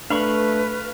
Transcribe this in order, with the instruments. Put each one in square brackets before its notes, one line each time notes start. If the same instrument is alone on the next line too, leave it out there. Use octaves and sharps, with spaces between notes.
[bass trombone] A3 [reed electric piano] D4 [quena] B4 [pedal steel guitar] F5 B5 C#6